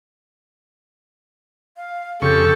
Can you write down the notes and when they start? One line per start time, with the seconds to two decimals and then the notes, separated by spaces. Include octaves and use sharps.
1.77 F5
2.22 F2 C#3 G4 A4 C#6